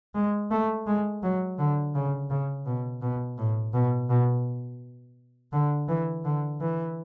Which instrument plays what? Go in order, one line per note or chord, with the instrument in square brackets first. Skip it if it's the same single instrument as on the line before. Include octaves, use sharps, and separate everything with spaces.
[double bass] G#3
A3
G#3
F#3
D3
C#3
C#3
B2
B2
A2
B2
B2
D3
E3
D3
E3